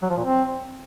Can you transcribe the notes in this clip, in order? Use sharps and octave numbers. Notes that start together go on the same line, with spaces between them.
F#3
F3
A#2
C4